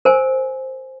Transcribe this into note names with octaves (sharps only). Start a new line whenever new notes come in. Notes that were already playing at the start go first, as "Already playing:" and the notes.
A#4 C5 G#5